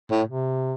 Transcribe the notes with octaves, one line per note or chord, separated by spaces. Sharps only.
A2
C3